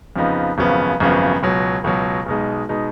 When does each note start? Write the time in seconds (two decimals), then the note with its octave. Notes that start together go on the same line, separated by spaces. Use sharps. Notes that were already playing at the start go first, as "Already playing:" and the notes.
0.16 F2 C#3 F3 B3 D#4
0.58 G#1 F#2 C#3 F3 B3
1.00 G#1 F#2 C#3 F3 B3
1.43 C#2 B2 F#3
1.84 C#2 B2 F#3
2.26 B1 B2 G#3 D#4
2.69 B2 G#3 D#4